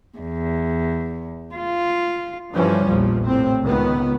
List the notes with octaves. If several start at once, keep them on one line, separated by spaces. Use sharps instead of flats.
E2
F4
G2 D3 E3 F3 G3 C#4
A#1 E2 A#2 F3
A2 C3 C4
C#2 D#3 B3